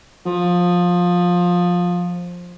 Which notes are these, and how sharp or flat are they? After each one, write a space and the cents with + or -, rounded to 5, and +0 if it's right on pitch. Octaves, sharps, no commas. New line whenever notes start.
F3 +20